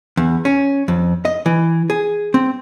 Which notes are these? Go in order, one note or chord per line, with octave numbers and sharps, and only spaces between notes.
E2
C#4
F2
D#5
E3
G#4
C4